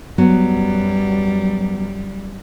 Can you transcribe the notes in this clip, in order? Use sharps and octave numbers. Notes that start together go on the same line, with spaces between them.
F#2 F#3 G3 B3 F#4